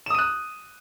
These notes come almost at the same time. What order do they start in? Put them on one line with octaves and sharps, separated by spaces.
E7 D#6 D#7 F#6